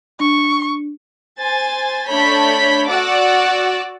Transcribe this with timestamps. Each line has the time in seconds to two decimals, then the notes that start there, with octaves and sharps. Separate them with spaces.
0.20 D4 C#6
1.39 C5 G#5 A6
2.07 A3 D4 C#5 B5 G6 B6
2.89 F#4 D5 F#5 D6 E6